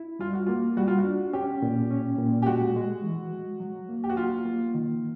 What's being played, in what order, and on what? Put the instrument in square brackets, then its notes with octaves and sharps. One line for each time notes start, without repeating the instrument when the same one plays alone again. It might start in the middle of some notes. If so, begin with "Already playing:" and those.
Already playing: [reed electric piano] E4
[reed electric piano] G3 [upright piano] F4
[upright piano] F#4
[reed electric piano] A#3 [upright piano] F4
[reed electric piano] G3 [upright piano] F#4
[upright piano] F4
F#4
[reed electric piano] D4
[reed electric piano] C#4 [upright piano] G4
[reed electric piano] A#2
C#4
A#2
[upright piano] G4
[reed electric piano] G#3 [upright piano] F#4
[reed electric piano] G#3
E3
G#3
F#3
A#3
[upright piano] G4
F#4
[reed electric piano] F#3 [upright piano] F4
[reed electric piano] A#3
D#3